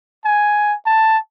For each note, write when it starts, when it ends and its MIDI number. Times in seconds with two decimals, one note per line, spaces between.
0.25 0.74 80
0.86 1.18 81